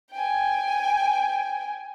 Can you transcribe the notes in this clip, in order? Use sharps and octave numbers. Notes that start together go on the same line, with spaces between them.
G5 G#5